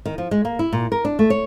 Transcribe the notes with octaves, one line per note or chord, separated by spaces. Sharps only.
D#3
F3
G#3
A#3
E4
A#2
A#4
D4
A3
C#5